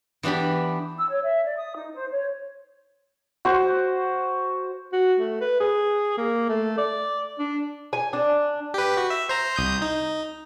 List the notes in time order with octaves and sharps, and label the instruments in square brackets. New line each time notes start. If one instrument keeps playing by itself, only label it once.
[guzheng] E3 B3 D4 G4 B5
[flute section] E6
C#5
E5
D5
D#6
D#4
C5
C#5
[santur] F#4 C5
[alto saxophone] F#4
A3
B4
G#4
A#3
A3
D5
D4
[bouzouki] G#5
D4
[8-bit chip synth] G4 B4
F#4
E5
C5 A#5
C2 D#6 G6
D#4